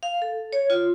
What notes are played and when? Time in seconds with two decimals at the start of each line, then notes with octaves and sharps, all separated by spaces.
0.03 F5
0.22 A4
0.53 C#5
0.70 F4